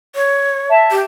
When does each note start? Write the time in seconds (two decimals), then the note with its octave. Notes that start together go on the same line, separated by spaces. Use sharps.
0.15 C#5
0.70 E5 A5
0.91 G4